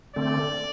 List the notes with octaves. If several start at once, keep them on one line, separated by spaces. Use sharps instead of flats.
D3 A3 C4 D5